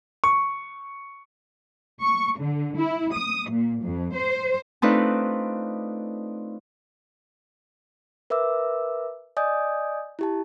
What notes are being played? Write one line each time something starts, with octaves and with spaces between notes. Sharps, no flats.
C#6
C#6
D3
E4
D#6
A#2
F2
C5
A3 C4 D4 D#4 F4 B4
A#4 B4 E5 D6 E6
D5 D#5 G#5 D#6 G6
E4 G4 A5